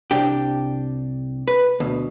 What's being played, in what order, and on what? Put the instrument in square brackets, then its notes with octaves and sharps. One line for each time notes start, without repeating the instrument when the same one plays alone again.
[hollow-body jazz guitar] C2 D4 G4
B4
D2 B2